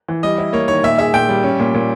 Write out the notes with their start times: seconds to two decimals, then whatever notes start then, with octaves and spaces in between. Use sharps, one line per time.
0.08 E3
0.23 G3 D#5
0.38 E4
0.53 A#3 C#5
0.68 D#3 C#5
0.83 A#2 E5
0.99 G#4 E5
1.14 A#2 G5
1.29 G3
1.43 C#4
1.60 A#2
1.74 A#2